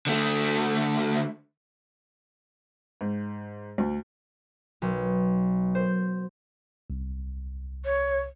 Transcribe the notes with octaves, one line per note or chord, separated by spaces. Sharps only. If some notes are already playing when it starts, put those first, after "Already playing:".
D3 A3
G#2
D2
B1
C5
C2
C#5